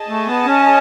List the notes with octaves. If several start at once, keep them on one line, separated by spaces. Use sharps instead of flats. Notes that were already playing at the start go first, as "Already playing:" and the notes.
Already playing: G#4 D#5 A5
A3
B3
C#4